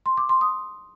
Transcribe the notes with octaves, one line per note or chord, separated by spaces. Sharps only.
C6
D6
C6
D#6